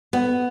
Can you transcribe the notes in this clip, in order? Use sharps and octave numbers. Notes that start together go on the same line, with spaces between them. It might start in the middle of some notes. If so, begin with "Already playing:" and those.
B3